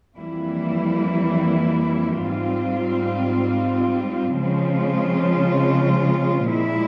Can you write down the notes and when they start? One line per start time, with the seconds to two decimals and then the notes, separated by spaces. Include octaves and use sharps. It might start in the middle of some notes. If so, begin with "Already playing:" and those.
0.17 F2 E3 G3 A#3 E4
2.28 G#2 G3 C4 F4
4.39 C#3 F3 G#3 C4 F4
6.51 A#2 G#3 E4